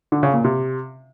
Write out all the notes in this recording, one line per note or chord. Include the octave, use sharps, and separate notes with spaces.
D3
C#3
A#2
C3